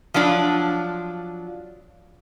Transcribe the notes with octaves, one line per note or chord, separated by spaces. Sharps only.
F3 F#3 D4 F4